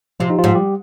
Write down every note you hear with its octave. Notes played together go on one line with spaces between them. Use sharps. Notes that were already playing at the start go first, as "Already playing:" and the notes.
C3 F3 F4
D#4
F3 F4
G#2
G3 G4